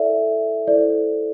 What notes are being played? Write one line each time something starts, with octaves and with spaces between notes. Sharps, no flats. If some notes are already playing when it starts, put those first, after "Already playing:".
Already playing: E4 A4 D5 E5
E4 A4 C5 D5